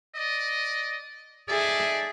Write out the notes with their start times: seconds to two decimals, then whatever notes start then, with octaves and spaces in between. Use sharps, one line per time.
0.16 D5 D#5
1.49 D#4 G#4 A4 D5 E5